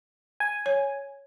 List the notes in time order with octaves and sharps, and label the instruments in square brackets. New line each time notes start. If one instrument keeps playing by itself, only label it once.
[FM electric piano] G#5
[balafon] C#5